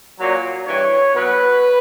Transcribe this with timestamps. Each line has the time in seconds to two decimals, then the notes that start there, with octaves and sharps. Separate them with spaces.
0.18 A#2 F#3
0.67 G2 E3 C#5
1.14 B2 F#3 B4